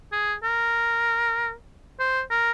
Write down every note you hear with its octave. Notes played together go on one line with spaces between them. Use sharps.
G#4
A#4
C5
A#4